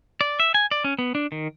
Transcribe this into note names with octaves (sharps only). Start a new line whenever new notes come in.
D5
E5
G#5
D5
C#4
B3
D4
D#3